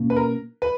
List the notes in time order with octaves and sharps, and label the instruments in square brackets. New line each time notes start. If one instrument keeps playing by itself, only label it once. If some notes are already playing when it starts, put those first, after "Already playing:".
Already playing: [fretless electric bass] B2 A#3 C#4
[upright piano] B4
A#4
B4